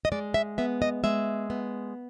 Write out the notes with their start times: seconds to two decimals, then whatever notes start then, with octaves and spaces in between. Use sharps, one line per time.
0.05 D#5
0.12 G#3 D5
0.34 E5
0.58 B3 E5
0.82 D#5
1.04 G#3 E5
1.50 B3